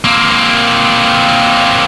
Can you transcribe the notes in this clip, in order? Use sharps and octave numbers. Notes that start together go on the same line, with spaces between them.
A#3 C4